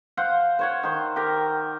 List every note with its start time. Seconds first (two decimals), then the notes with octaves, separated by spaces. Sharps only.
0.17 C5 F5 F#5
0.59 C5 C#5 F#5
0.83 D#3 C5
1.16 G4 A#4